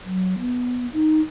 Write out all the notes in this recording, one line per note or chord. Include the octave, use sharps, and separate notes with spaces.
F#3
B3
D#4